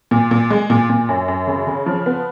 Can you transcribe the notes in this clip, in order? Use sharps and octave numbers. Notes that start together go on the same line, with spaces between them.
A#2
A#2
G#3
A#2
A#2
F#2
F#2
C#3
C#3
F3
B3